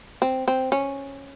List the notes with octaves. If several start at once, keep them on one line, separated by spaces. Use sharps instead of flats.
C4
C4
C#4